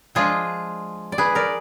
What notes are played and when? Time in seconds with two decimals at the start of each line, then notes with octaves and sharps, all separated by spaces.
0.15 F3 G#3 D4 F4 G#4
1.12 D5
1.18 G#4 B4
1.35 A#4 D5